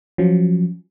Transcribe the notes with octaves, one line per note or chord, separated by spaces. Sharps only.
F3 F#3 C#4